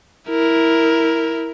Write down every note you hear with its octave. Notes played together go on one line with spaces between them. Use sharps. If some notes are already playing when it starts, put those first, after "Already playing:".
E4 A#4